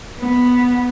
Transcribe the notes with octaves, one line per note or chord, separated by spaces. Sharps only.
B3